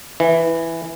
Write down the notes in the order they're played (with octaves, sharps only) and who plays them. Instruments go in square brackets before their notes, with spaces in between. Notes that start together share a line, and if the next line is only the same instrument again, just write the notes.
[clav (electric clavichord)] E3